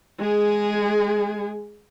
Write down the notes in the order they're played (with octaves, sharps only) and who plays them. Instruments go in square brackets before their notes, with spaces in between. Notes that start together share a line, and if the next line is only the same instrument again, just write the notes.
[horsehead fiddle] G#3 G#4